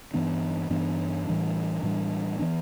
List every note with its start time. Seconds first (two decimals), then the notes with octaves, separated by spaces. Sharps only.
0.14 G2 E3 B3 D4
0.70 G2 E3 B3 D4
1.27 A2 E3 G3 D4
1.83 A2 E3 G3 D4
2.39 E3 B3 D4